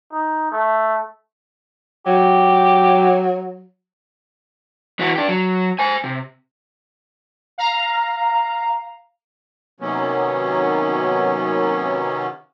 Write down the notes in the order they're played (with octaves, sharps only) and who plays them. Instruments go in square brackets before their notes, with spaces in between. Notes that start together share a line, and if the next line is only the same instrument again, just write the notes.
[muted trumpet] D#4
A3
[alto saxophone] F#3 [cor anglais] G4
[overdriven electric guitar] E3 F#4
D4 G4
F#3
C5 G#5
C3
[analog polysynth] F5 A#5
[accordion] C3 D#3 F#3 A#3 B3 C#4